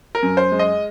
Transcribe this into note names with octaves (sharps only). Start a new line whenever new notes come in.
A#4
F#2
C5
G#3
D#5